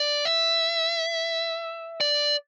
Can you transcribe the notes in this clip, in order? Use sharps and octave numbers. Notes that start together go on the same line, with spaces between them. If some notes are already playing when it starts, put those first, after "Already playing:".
Already playing: D5
E5
D5